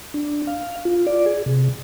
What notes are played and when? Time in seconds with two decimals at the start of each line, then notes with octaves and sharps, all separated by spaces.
0.14 D4
0.47 F5
0.85 F4
1.07 D5
1.26 G#4
1.46 C3